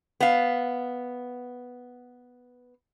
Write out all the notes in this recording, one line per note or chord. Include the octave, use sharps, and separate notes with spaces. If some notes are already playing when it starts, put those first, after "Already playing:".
B3 F5